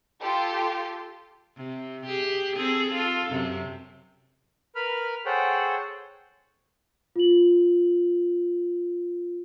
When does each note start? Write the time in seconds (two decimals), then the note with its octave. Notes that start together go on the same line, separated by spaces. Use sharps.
0.22 F4 G4 A4 G5 C6
1.57 C3
2.06 G4 G#4
2.56 C4 G#4 A4
2.94 F4 A4
3.30 F#2 C3
4.75 A#4 B4 B5 F6
5.26 G#4 A4 C5 C#5 F#5 G5
7.16 F4 F#7